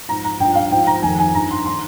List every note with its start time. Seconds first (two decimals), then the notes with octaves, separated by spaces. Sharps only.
0.08 G#2 F3 A#5
0.24 A#5
0.40 G2 F3 G5
0.55 F5
0.71 G#2 F3 G5
0.87 A#5
1.02 F2 D#3 G#5
1.18 G#5
1.34 G2 D#3 A#5
1.51 C6
1.66 D#3 C6